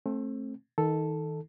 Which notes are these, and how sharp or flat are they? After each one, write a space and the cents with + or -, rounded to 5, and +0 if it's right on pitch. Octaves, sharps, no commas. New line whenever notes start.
A3 -5 C4 +30
D#3 +25 D#4 +20 A4 +0